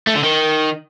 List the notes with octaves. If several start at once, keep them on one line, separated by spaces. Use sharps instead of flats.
A3
D3
D#3